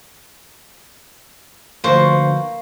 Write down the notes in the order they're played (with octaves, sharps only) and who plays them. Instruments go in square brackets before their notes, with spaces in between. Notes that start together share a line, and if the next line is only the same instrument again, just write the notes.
[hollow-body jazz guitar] D2 F3 [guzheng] A#3 [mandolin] B4 C#6 [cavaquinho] C5